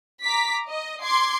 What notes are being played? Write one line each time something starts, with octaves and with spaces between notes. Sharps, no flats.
A#5 D6 B6
D#5
C6 D6 G#6 C7